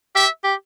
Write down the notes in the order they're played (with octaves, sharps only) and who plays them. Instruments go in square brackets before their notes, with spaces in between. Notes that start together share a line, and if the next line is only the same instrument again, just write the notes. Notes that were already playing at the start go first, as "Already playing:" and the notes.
[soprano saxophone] G4 [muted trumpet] E5
[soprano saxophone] G4